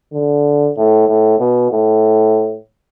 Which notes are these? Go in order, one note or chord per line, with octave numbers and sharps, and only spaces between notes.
D3
A2
A2
B2
A2